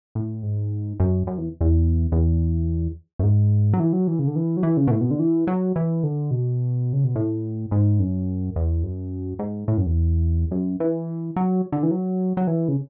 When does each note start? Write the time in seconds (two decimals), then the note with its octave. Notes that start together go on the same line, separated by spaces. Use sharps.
0.15 A2
0.43 G#2
1.00 F#2
1.27 F#2
1.38 E2
1.61 E2
2.12 E2
3.19 F#2
3.23 G#2
3.73 F#3
3.80 E3
3.93 F#3
4.07 E3
4.19 C#3
4.27 D3
4.36 E3
4.57 F#3
4.63 E3
4.77 C#3
4.87 B2
4.91 A2
5.01 B2
5.11 D3
5.19 E3
5.47 F#3
5.76 E3
6.03 D3
6.31 B2
6.93 C#3
7.04 B2
7.16 A2
7.71 G#2
8.00 F#2
8.56 E2
8.83 F#2
9.39 G#2
9.68 A2
9.78 F#2
9.86 E2
10.51 F#2
10.80 E3
11.36 F#3
11.72 D3
11.83 E3
11.91 F#3
12.37 F#3
12.47 E3
12.68 C#3